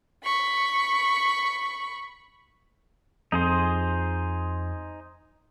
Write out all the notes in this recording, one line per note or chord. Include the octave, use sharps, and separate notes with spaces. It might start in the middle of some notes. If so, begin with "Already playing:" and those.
B5 C#6
F2 D#4 G#4 C5